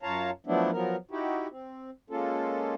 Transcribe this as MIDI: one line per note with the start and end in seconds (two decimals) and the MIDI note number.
0.03 0.30 42
0.03 0.30 65
0.03 0.30 73
0.03 0.30 77
0.03 0.30 81
0.03 0.30 82
0.47 0.71 53
0.47 0.71 54
0.47 0.71 57
0.47 0.71 59
0.47 0.71 62
0.47 0.71 64
0.72 0.96 53
0.72 0.96 54
0.72 0.96 59
0.72 0.96 70
1.11 1.48 63
1.11 1.48 64
1.11 1.48 66
1.11 1.48 67
1.50 1.90 60
2.10 2.75 56
2.10 2.75 58
2.10 2.75 61
2.10 2.75 65
2.10 2.75 69